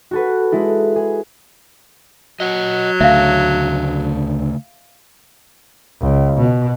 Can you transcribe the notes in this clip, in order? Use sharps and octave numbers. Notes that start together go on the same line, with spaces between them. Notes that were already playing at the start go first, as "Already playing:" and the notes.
F#4 A4 B4
G#3 E4 A4
G#4
F#3 D#5 F#5
D2 C#3 A3 E5 F5
C#2
B2